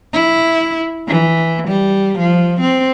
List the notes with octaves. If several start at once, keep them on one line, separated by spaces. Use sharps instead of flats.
E4
E3
G3
F3
C4